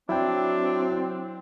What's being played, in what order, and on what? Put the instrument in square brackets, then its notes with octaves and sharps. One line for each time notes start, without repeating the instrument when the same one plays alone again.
[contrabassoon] F#3 [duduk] C4 [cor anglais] D4 [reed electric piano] E4 G5